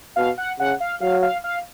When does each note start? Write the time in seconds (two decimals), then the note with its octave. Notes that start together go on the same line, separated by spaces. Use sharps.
0.16 B2 F5
0.38 F#5
0.60 C#3 F#5
0.80 F5
1.01 F#3 F5
1.22 F5
1.44 F5